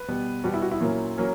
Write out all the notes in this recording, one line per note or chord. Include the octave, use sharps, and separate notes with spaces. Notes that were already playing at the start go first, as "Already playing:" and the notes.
Already playing: B4
B2 G3 B3
B2 G3 B3 F#4
E4
F#4
E4
A#2 F#3 A#3 C#4
F#3 A#3 C#4